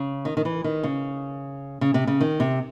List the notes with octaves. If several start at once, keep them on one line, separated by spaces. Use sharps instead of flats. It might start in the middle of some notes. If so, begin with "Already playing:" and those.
Already playing: C#3
D#3
D#3
E3
D#3
C#3
C#3
C3
C#3
D#3
C3